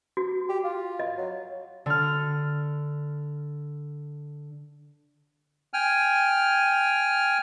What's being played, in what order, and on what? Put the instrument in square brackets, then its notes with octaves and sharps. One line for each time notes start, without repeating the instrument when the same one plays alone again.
[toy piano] F#4
[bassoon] G4
F4
[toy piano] D#5
[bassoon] F#3
[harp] D3 F6
[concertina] G5 G#5 F6